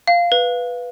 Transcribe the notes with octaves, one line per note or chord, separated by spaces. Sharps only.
F5
B4